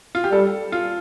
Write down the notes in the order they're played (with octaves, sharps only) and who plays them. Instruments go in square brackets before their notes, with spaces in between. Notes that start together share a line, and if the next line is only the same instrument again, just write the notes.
[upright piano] F4
G4
[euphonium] G3 [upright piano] A4
[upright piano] F4